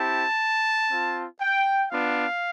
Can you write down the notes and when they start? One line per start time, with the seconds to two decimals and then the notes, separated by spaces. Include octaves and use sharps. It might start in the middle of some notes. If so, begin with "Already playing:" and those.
Already playing: C4 E4 G4 A5
0.91 C4 F4
1.41 G5
1.91 B3 D4 F4 F5